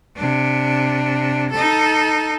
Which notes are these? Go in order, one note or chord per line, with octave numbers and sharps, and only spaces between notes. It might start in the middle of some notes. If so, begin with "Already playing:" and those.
C3 D4
D#4 A4